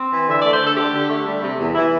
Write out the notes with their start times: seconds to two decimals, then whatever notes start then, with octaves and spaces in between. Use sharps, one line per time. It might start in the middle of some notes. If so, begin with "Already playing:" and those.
Already playing: C4
0.09 E3
0.26 D3 E5
0.40 A3 D5
0.52 C5
0.59 D3 A4
0.75 D4 G4
0.91 D3
1.08 A3
1.25 G3
1.41 C3
1.58 E2
1.74 E3 E4